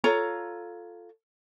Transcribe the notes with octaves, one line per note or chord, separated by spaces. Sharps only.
F4 A4 C#5 A#5